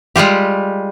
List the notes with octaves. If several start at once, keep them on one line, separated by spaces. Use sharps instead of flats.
G3 G#3 F4 G4